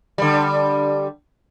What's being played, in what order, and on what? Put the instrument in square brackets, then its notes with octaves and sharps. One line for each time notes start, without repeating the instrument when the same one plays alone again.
[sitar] D3 G3